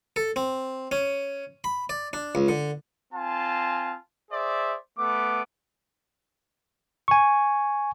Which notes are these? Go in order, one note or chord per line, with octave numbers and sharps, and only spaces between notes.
A4
C4
C#4
B5
D5
D4
C#2
D3
C4 F4 G#5 A5
G#4 C5 D5 E5
A3 B3 B4 D6
G#5 C#6